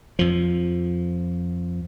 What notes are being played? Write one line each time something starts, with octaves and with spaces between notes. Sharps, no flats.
F2 F3